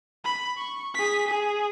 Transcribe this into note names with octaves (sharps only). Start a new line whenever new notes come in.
B5
C#6
G#4 B6
G#4